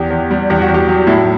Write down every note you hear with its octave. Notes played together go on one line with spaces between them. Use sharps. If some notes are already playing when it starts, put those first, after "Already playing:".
Already playing: E2 G4
E2
G3
E2 G4
F#4
E2
G4
F#3
A2 E4